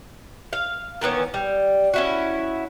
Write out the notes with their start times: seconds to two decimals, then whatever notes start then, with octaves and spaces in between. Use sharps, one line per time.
0.53 F5
1.01 D#3 E3 B3 C#4
1.34 G3
1.94 C#4 E4 F#4